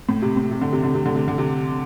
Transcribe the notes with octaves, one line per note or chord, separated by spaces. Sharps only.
A2
C3
A2
C3
D3
C3
D3
C3
D3
C3
D3
C3